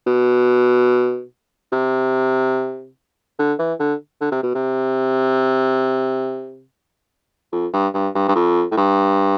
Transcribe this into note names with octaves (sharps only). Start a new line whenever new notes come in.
B2
C3
D3
E3
D3
D3
C3
B2
C3
F2
G2
G2
G2
G2
F2
A2
G2